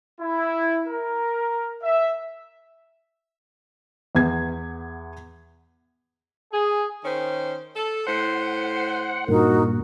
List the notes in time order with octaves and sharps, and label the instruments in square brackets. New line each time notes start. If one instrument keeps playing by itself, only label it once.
[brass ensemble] E4
A#4
E5
[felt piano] E2 B3 G#6
[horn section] G#4
[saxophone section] D#3 C#4 C5
A4
[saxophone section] A2 C5 [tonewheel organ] F#5
[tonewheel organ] G2 A#2 [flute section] D#4 F#4 A#4